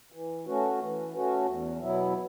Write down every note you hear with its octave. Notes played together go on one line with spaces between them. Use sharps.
E3
A3 C#4 F#4
E3
A3 C#4 F#4
E2
B2 F#3 B3 E4